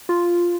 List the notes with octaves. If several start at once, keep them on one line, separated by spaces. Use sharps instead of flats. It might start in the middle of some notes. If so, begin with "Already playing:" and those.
F4